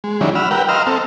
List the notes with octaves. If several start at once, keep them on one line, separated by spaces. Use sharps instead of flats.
G#3
D#3 F#3 G3 C#4 D4 E4
F#5 B5 E6 F6
G4 A#4 B4 F#5 G5
D#5 F5 A#5 C6 E6 F6
C4 A4